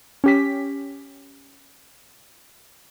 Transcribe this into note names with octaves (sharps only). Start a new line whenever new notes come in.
C#4 G4 B6